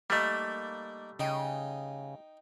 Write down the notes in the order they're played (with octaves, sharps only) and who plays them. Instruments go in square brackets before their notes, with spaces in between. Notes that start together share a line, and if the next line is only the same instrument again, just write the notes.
[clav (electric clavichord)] G3 A3 [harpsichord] A#3 D#4
[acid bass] C#3 [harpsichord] D#4 G5 D#6